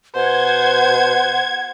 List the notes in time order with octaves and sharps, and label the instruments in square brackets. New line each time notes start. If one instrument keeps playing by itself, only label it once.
[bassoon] B2 [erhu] C5 [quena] F#5 [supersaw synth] G#6